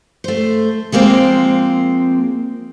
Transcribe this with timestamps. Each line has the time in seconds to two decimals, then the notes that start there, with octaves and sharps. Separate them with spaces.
0.24 A3 C5
0.92 F3 G#3 A#3 C4 C5